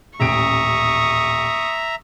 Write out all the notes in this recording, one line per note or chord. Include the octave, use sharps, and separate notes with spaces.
D#1 A1 E5 A#5 C#6 D#6 D7